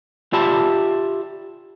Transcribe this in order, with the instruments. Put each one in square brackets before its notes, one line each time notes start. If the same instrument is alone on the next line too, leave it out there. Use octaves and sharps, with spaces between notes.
[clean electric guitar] F4 G4 D5 E5 A5 B5